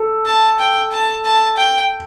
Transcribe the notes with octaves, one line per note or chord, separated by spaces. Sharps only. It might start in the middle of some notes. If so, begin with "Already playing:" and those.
Already playing: A4
A5
G5
A5
A5
G5